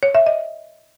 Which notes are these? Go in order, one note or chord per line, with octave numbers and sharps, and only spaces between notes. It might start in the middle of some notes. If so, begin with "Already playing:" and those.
C#5
E5
D#5